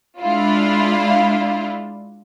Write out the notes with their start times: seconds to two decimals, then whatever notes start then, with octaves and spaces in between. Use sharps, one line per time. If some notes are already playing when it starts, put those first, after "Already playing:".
0.21 G#3 D4 E4 F4